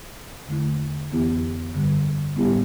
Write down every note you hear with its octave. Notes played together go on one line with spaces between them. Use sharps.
E2 D3 A3 E4
F2 E3 B3 E4 G4
G2 D3 G3
A2 G3 B3 E4 G4